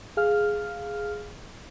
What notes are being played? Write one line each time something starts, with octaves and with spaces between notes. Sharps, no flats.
G#4 F5 F6